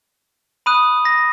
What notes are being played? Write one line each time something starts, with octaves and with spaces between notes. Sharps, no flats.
B5 D#6 F#6 D#7
A#6